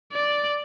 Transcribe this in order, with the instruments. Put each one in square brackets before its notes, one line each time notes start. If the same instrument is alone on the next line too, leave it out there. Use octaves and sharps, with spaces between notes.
[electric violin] D5